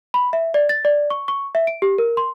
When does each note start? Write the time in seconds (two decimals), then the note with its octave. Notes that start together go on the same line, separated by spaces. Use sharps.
0.14 B5
0.33 E5
0.54 D5
0.69 A6
0.85 D5
1.10 C#6
1.28 C#6
1.55 E5
1.67 D7
1.82 G4
1.98 A#4
2.17 C6